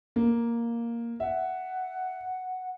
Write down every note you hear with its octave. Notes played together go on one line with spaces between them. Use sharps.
A#3
E5 F#5